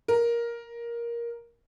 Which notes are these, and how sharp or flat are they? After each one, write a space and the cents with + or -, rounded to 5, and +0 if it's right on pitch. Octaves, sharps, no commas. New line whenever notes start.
A#4 +10